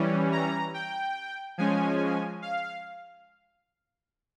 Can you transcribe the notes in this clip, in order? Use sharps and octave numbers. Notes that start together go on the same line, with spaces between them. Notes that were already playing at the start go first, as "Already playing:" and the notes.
Already playing: E3 G3 C#4
A#5
G5
F3 G#3 C#4 G#5
F5